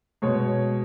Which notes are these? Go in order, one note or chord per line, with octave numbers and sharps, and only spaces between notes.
B2 G#3 C#5